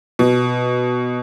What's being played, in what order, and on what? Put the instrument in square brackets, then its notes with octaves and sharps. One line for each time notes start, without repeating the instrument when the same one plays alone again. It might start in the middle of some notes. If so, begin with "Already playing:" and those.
[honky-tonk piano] B2